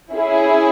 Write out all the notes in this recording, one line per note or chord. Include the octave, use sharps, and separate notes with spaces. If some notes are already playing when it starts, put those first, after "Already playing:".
C#4 E4 G#4